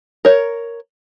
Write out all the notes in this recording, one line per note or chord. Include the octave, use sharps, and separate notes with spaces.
A#4 C#5